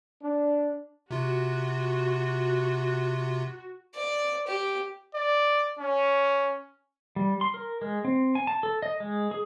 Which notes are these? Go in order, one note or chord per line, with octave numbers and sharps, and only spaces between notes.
D4
C3 F4 F#4
D5
G4
D5
C#4
G3
C6
A#4
G#3
C4
G#5
A5
A4
D#5
G#3
G#4